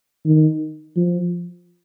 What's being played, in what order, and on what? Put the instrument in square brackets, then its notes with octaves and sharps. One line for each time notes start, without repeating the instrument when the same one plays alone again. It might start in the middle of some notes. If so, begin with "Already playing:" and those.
[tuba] D#3
F3